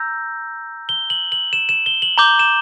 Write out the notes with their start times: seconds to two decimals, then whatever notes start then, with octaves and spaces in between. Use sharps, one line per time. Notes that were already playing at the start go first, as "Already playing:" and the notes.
Already playing: A#5 E6 G6 A#6
0.89 G7
1.10 F#7
1.32 F#7
1.53 E7
1.69 E7
1.86 G7
2.02 F#7
2.18 A#5 D6 G6 G7
2.39 E7